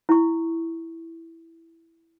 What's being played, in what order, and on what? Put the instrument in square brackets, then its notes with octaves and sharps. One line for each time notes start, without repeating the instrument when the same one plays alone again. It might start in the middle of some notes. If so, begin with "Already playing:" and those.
[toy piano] E4 C#6